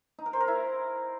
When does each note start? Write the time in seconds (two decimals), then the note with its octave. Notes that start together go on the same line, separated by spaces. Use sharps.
0.19 D#4
0.26 A#4
0.33 C5
0.41 A#4
0.48 E4